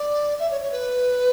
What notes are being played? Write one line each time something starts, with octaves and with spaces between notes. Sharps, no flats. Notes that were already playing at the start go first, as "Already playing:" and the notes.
Already playing: D5
E5
C#5
C#5
B4